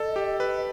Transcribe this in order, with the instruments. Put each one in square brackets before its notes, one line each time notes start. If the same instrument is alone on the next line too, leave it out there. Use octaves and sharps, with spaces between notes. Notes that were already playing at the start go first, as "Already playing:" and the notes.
Already playing: [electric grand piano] A4 [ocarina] D#5
[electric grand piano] G4
B4